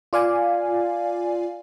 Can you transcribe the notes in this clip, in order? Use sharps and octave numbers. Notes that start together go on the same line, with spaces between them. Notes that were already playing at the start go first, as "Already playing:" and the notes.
F4 D5 F5 G#5